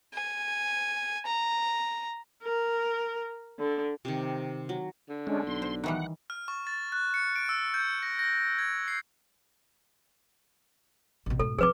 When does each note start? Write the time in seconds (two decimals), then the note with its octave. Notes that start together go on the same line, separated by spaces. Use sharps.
0.13 G#5
1.26 A#5
2.44 A#4
3.59 D3
4.05 C3 D#3
4.69 F#3
5.09 D3
5.27 G#3 C#4 D4
5.47 B1 C6
5.62 C5
5.84 D#3 E3 G3 F#5
6.30 F6
6.48 C#6
6.67 A6
6.92 F#6
7.14 C#7
7.36 D7
7.49 E6
7.74 G6
8.03 A#6
8.19 A#6
8.58 G#6
8.88 C7
11.26 A1 B2
11.39 G#2 B2 A4
11.59 F3 C4 G#4 B4 D6